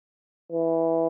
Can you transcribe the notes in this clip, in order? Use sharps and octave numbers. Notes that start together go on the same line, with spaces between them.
E3